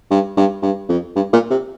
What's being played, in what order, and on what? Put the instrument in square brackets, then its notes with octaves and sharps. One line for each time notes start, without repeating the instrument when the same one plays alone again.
[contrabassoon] G2
G2
G2
F2
G2
A#2
C3